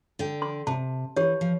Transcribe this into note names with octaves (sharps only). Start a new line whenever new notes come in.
D3 G5
C6
C3 A5
E3 G4 C#5
F3